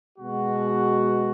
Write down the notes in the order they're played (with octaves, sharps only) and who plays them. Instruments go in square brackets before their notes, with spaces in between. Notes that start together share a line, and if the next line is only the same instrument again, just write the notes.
[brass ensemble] B2 G#3 B3 F#4